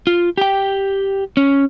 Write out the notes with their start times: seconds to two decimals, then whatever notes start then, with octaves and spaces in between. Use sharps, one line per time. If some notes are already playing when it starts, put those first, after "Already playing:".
0.07 F4
0.38 G4 G5
1.37 C#4